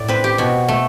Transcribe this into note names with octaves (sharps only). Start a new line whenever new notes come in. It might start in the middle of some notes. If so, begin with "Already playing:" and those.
Already playing: A2 D5
C4 B4
G4
B2 F#4
A3